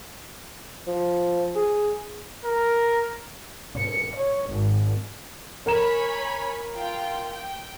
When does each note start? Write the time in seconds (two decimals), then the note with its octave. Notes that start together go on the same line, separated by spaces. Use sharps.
0.87 F3
1.56 G#4
2.45 A#4
3.77 C#7
4.16 C#5
4.50 G#1
5.66 A#4 C#5 G#5 A#5 B5 E7
6.74 F4 G5
7.29 G5